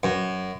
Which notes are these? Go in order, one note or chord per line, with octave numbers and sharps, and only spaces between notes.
F#2